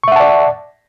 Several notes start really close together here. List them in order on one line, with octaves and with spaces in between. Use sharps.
C#6 E5 F#5 A5 D5